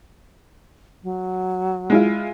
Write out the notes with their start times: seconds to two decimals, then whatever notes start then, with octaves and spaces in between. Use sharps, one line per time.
1.03 F#3
1.90 G#3 E4 F4